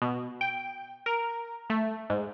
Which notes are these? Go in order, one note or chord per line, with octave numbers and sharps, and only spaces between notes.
B2
G5
A#4
A3
G#2